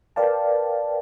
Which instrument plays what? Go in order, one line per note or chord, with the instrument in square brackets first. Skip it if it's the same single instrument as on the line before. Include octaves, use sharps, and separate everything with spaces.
[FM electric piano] A#4 B4 D5 F5 G5 A5